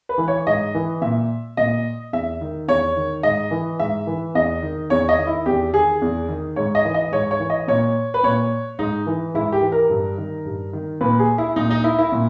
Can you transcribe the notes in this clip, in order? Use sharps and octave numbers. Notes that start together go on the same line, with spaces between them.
B4
E3
C#5
G#2 D#5
E3
A#2 E5
A#2 D#5
E2 E5
D#3
E2 C#5
D#3
G#2 D#5
E3
G#2 E5
E3
E2 D#5
D#3
E2 C#5
D#5
D#3
E4
E2 G4
D#3 G#4
E2
D#3
G#2 C#5
D#5
E3
D#5
G#2 C#5
C#5
E3
D#5
A#2 C#5
B4
A#2 C#5
G#2 D#4
E3
G#2 E4
G4
E3
A#4
G2
D#3
G2
D#3
A#2 B4
G#4
E4
A#2 D#4
D#4
E4
E4
A#2